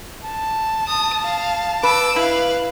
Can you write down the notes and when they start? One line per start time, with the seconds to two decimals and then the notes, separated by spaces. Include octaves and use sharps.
0.24 A5
0.88 D#6
1.23 F5
1.83 B4 D6 E6
2.16 E4 B4 F5